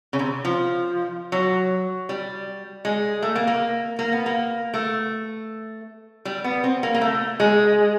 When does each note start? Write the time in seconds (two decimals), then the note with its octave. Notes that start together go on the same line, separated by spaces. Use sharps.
0.13 C#3
0.19 C3
0.45 F3
1.32 F#3
2.09 G3
2.85 G#3
3.23 A3
3.36 A#3
3.47 A#3
3.99 A#3
4.13 B3
4.26 A#3
4.74 A3
6.25 G3
6.44 B3
6.64 C4
6.83 A#3
6.94 A#3
7.01 A3
7.40 G#3